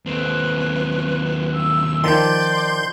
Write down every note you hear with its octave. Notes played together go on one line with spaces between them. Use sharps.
D#2 C4 B4
E6
D#3 F3 D5 C6 G6